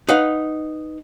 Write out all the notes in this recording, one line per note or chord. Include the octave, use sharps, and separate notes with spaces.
D#4 B4 F5 F#5